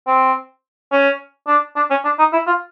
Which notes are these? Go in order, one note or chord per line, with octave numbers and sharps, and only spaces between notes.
C4
C#4
D4
D4
C#4
D4
D#4
E4
F4